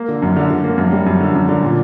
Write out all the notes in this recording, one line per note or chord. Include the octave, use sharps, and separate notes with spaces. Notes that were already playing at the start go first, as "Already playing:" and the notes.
Already playing: A#3
D3
F#2
D3
D3
A#3
F#2
G3
F#2
D3
F#2
D3
A#2